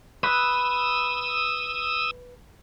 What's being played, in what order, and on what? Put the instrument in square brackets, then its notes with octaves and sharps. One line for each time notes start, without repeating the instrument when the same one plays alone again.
[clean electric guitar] B4 [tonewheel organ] D#6 E6